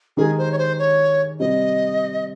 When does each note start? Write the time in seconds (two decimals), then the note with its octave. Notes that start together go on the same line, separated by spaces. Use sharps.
0.17 D#3 G#3 D#4 G4 G#4 A#4
0.38 C5
0.52 C#5
0.58 C5
0.79 C#5
1.40 C3 G3 C4 D#5